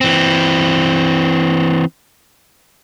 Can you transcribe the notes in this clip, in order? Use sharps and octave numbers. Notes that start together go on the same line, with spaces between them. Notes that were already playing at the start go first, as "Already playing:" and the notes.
E3 C4